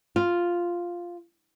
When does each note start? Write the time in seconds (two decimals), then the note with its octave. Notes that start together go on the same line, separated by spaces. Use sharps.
0.16 F4